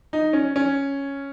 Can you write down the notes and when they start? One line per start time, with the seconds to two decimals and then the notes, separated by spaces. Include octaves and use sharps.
0.13 D#4
0.33 C#4
0.56 C#4